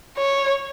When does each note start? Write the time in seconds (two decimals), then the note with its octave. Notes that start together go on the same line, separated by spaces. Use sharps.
0.18 C#5